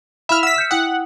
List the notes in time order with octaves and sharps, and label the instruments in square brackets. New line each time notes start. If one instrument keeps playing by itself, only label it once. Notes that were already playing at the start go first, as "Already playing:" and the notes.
[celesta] E4 F5 B5 [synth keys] E5 F6
[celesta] F#5 [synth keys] E6 B6
[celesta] F6 G6 C#7
[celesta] E4 G5 D#6 [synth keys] F#5